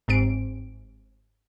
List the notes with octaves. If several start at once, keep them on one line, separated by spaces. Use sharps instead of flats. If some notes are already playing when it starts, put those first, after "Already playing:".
G1 G#2 C4 D7